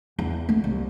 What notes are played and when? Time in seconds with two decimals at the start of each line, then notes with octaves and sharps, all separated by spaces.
0.19 E2
0.49 A3
0.64 C2